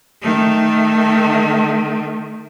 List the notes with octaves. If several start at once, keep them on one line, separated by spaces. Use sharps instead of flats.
D#3 A3